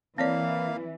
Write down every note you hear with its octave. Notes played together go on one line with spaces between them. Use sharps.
E3 A#3 C4 C#5 D5 F5